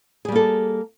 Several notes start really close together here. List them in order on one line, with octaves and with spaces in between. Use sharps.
G#4 G3 A#3 A4